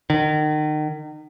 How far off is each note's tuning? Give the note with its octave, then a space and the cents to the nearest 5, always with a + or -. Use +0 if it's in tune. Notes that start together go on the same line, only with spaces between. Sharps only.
D#3 -35